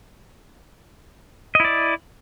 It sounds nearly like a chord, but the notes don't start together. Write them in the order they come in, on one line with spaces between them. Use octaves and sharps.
D#5 E4 D5